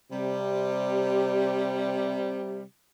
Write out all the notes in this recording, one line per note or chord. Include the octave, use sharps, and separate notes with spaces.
C3 G3